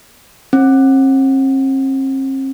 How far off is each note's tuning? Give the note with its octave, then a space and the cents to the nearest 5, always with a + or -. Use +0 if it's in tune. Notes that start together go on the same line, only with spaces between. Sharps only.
C4 +45